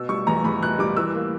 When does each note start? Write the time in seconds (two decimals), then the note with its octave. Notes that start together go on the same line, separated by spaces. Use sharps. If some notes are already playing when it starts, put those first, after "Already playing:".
Already playing: B2 E6
0.09 G3 C#6
0.27 E2 A#5
0.44 E2 B5
0.62 B2 F#6
0.79 G3 D6
0.96 E3 E6
1.15 A#3